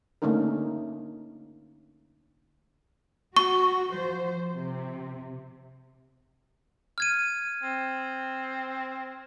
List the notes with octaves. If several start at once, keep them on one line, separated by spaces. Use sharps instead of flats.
D3 A3 A#3 C#4 D#4 A#4
F#4 C#6
F3 C5
C3
F6 G#6 D#7
C4